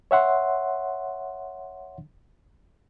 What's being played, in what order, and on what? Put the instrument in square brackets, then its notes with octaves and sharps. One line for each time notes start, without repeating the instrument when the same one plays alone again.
[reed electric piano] C#5 E5 F#5 C6